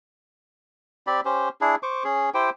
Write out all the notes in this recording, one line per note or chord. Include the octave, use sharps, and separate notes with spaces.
C4 G4 D5 B5
C#4 G4 C5
D4 E4 G#4
C5 C#6 D6
C#4 G#4
E4 G4 C5 G5